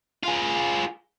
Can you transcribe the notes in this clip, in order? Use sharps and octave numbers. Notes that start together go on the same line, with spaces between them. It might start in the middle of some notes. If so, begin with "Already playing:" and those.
F4 G#4